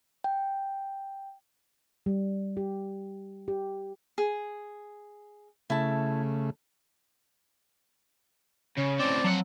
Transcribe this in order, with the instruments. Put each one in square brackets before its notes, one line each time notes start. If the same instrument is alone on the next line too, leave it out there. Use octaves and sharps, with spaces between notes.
[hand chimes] G5
[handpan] G3
G4
G4
[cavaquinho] G#4
[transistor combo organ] C#3 A3 [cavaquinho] E4 A5
[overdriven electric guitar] C#3 [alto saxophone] C#4
[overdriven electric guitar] A2 C4 [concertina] D5
[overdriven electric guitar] F3 F#5 [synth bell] F#3 C4